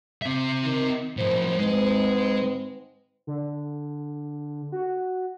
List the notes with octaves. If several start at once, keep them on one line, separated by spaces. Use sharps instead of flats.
C4 E5
D#3
F#2 A2 D#3 F3 C5
G#2 G#3 C4 B4
D3
F#4